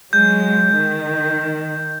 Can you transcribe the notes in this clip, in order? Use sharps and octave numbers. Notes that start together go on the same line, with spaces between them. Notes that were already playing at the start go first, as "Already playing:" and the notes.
F#3 G#3 G6
D#3